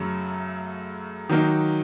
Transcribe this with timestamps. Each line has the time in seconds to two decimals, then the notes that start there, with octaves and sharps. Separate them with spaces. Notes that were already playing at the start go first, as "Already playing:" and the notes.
Already playing: F#2 C#3 F#3 A3
1.29 D#3 F#3 A#3 D#4